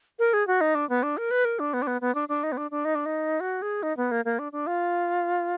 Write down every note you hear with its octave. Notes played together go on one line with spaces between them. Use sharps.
A#4
G#4
F#4
D#4
D4
B3
D4
A#4
B4
A#4
D4
B3
D4
B3
B3
D4
D4
D#4
B3
D4
D4
D#4
D4
D#4
F#4
G#4
D#4
B3
A#3
A#3
D4
D4
F4